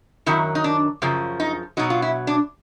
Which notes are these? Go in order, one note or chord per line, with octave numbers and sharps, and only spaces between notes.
F#2 D#3 F#3 E4
D#4
D4
F#2 C#3 F3
D#4
B2 F#3 D#4
F4
E4
D4